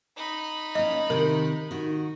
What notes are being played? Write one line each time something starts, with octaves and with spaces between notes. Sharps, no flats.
D#4 B5
A#3 C#4 D#5
C3 D#3 A#4
D#3 F#4